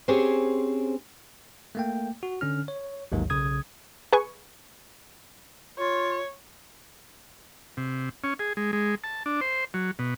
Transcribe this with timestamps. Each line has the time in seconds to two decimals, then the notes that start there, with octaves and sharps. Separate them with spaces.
0.08 C4 C#4 G4 G#4 C5 C#5
1.75 A3 A#3 G5
2.23 F#4
2.41 D3 C#4 F6
2.68 C#5
3.12 A1 D#2 G#2 D#3 F#3
3.30 B1 C#3 D#6 G#6
4.13 G#4 B4 G#5 C#6
5.79 F4 C#5
7.77 C3
8.24 C#4
8.39 G#4
8.57 G#3
8.73 G#3
9.04 A5
9.26 D4
9.41 C5
9.74 F#3
9.99 B2